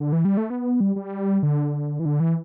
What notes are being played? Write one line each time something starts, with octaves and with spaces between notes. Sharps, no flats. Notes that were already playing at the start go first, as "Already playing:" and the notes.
D3
E3
G3
A3
B3
G3
G3
D3
E3
D3
E3